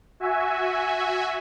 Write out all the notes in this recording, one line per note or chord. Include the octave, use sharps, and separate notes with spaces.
F#4 E5 G#5